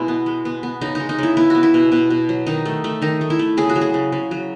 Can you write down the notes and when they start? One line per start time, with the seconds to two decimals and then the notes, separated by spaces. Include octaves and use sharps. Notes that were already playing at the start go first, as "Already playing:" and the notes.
Already playing: B2 G#3 E4
0.08 B3
0.26 G#3
0.45 B3
0.63 B3
0.81 C#3 D#4
0.95 G#3 D#4
1.09 D#4
1.18 C#3 E4
1.37 B3 E4
1.50 B3 F#4
1.63 E4
1.74 B2
1.92 B2
2.10 B2
2.29 F#3
2.47 D#3 D#4
2.65 A3
2.84 A3
3.02 D#3 D#4
3.21 A3
3.30 E4
3.39 A3
3.57 C#3 G#4
3.69 F#4
3.76 F#3
3.81 G#4
3.94 C#3
4.12 C#3
4.31 F#3